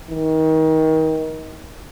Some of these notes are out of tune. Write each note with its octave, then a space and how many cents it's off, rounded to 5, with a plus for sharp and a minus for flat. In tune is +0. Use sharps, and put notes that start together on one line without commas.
D#3 +30